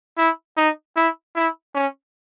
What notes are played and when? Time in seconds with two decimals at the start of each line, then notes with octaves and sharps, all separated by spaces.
0.18 E4
0.57 D#4
0.96 E4
1.36 E4
1.75 C#4